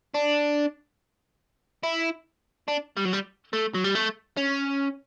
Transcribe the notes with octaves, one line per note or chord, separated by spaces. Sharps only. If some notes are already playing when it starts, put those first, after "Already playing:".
D4
E4
D4
G3
F#3
G3
A3
F#3
G3
A3
C#4